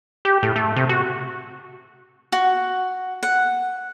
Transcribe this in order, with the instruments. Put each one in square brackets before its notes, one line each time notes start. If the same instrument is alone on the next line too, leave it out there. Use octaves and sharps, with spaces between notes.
[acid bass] G4
A2
A3
C3
F#4
[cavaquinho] F#4
F#5